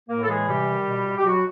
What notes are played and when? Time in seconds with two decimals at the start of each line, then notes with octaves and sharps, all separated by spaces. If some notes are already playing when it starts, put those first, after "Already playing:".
0.08 A2 A#3 A#4
0.23 A4
0.28 E3 G#3 G#4
0.47 C3 G3 G4
0.67 D#3
0.87 B2
1.06 B2
1.17 G4
1.25 B2 F#3 F#4